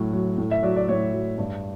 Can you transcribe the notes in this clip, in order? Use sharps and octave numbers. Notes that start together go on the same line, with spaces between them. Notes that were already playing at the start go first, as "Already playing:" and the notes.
Already playing: A2 F#3
F#3
A2
E5
F#3 D5
D5
A2 C#5
F#3
G2